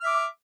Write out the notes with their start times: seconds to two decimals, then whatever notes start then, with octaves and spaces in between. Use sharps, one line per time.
0.01 F6
0.03 E5
0.06 D6